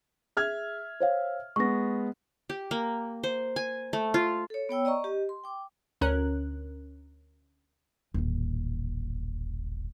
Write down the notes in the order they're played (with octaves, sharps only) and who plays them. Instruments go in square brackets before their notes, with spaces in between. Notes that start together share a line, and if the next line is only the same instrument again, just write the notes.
[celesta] G#4 [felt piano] E5 F6 G#6
[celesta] C5 C#5 F5
[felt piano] G#3 B3 [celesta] C#6 A#6
[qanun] G4
A#3
C5
G#5
A3
F4
[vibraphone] A4 C#5
B3 C#5 G5 E6
D5 D#5 A#5 C#6
G4 D#5
C6
G5 D6
[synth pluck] D2 C#4 A#4 F#6
[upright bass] D#1 A1